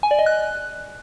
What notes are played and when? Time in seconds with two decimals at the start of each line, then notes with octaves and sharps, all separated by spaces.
0.03 G#5
0.11 D5
0.19 D#5
0.26 F#6